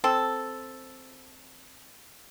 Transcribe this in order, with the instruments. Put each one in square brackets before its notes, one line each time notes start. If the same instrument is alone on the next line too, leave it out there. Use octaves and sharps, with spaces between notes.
[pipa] C4 A4